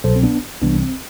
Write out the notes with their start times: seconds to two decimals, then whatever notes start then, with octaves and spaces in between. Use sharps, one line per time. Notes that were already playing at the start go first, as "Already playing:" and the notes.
0.04 C2 B2 F#3 A4 C5
0.16 C4
0.23 B3 D4
0.61 C2 C3 E3 G3 B3 D4
0.80 C4